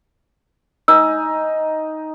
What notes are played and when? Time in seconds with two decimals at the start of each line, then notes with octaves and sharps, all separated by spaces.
0.88 D#4 G#5 E6